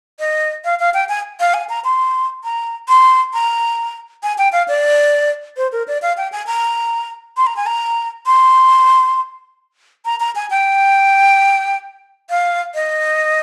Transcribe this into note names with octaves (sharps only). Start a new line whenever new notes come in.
D#5
F5
F5
G5
G#5
F5
G#5
A#5
C6
A#5
C6
A#5
G#5
G5
F5
D5
C5
A#4
D5
F5
G5
G#5
A#5
C6
A#5
G#5
A#5
C6
A#5
A#5
G#5
G5
F5
D#5